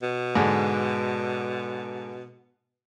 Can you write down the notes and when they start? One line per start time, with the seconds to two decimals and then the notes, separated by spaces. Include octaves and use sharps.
0.03 B2
0.36 G#2 D3